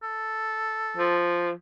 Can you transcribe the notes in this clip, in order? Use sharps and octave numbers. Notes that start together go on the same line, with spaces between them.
A4
F3